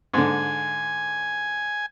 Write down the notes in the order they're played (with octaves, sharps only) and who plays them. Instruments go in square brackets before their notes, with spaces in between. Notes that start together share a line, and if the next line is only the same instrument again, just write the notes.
[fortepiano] G#2 D3 [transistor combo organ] G#5